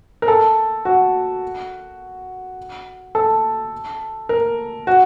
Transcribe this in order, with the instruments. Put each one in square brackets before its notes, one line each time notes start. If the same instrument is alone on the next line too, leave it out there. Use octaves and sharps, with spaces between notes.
[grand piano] A#4
A4
F#4
A4
A#4
F#4